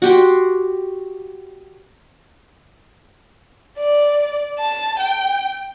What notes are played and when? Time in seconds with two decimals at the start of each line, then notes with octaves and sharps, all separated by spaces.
0.02 F#4 G4 C6
3.77 D5
4.58 A5
4.98 G5